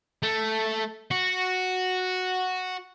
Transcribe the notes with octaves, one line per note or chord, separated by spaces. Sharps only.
A3
F#4